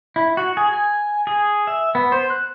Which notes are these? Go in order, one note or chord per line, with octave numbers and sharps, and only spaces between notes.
E4
F#4
G#4
G#5
G#4
E5
B3
C5
F#6